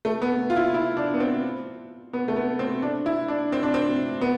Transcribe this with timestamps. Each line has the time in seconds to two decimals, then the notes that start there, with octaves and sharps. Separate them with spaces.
0.05 A3
0.22 B3
0.50 F4
0.56 E4
0.74 E4
0.97 D4
1.14 B3
1.20 C4
2.13 B3
2.28 A3
2.36 B3
2.59 C4
2.82 D4
3.06 E4
3.28 D4
3.52 C4
3.63 D4
3.74 C4
4.21 B3